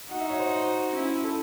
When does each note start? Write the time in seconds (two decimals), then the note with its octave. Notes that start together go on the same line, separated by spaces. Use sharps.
0.10 D#4 F#4 F#5
0.20 E5
0.29 C#5
0.39 C5
0.95 C#4 E4
1.24 A4